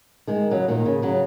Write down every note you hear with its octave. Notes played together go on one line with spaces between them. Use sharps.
D#3 G#3
C#3 F#3
A#2 D#3
C#3
C#3 F#3